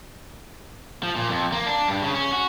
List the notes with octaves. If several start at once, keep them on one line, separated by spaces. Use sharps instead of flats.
F3
A#2
F2
A#3
D4
G2
C#3
C#4
F#4